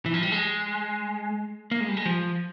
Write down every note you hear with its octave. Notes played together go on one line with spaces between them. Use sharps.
E3
F3
G3
G#3
A#3
G#3
G3
G#3
F3